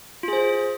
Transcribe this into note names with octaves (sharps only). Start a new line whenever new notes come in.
F4 G#4 C5